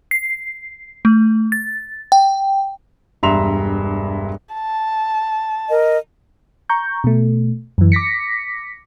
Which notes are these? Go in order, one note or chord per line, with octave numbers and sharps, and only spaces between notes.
C7
A3
A6
G5
E1 G2 E5 A#5 C6 F7
A5
A#4 D#5
A#5 C#6 G6
B2 A3
F#2 E3
D6 A#6 B6 C#7